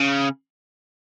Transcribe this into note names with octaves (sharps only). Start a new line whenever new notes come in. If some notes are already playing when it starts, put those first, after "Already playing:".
Already playing: C#3